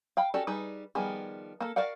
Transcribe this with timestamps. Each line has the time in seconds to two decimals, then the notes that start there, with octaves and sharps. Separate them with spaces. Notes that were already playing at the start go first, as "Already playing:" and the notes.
0.17 F5 G5 B5
0.34 C#4 F#4 G4 A4 D5
0.47 G3 D#4 G#4 B4
0.95 D#3 F3 G3 B3 G#4
1.60 A#3 A4
1.76 F#4 A#4 D5 F5 F#5